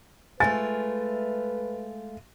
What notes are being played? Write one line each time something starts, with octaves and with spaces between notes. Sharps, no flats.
G#3 A3 F4 B4 G#5 A6